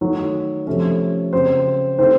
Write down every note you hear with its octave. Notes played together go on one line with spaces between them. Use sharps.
D#3 F#3 A3
C3 F3 A3 C#4
C#3 F#3 C4 C5
C3 D#3 A3 C4 C5